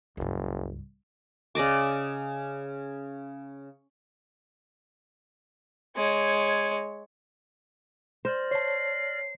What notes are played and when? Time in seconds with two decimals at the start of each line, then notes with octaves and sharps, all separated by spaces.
0.17 F#1 C#2 G2
1.55 C#3 D5 D#5 D6
5.97 G#3 C#5
8.25 C5 D5 F6 A#6
8.51 C#5 A5 C7